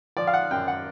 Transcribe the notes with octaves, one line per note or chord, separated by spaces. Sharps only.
F3 D5
F5
F#5
F#2 G5
F#5